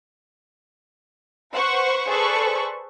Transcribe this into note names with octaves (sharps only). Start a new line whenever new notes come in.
B4 C5 F#5 C#6
G#4 A4 B4 C5 D5 C#6